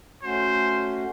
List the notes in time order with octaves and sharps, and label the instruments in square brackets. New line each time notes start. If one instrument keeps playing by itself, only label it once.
[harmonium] A3 C#4 F#4 [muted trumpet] C5